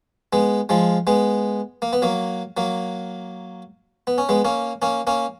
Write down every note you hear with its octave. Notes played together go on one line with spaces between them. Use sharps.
G#3 B3
F3 G#3
G#3 B3
A#3
B3
F#3 A#3
F#3 A#3
B3
C#4
G#3 B3
A#3 C#4
A#3 C#4
A#3 C#4